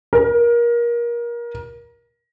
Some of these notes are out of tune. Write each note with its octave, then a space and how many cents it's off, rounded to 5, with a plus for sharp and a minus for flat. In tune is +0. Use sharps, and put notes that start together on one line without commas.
A#4 +25